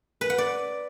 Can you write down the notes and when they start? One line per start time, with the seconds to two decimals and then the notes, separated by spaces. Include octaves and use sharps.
0.21 B4
0.30 F#5
0.38 D5